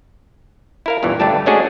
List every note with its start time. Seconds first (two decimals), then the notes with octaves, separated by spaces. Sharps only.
0.86 E4 A#4 F5
1.03 E2 G2 A#2 E3
1.20 G1 G2 A3 D4 G4 A5
1.46 G#3 A3 C#4 D4 F#4 G#4